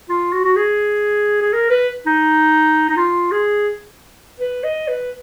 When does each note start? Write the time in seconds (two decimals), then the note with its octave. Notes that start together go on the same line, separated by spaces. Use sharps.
0.09 F4
0.33 F#4
0.45 F#4
0.56 G#4
1.42 G#4
1.53 A#4
1.70 B4
2.06 D#4
2.90 D#4
2.96 F4
3.32 G#4
4.40 B4
4.64 D#5
4.88 B4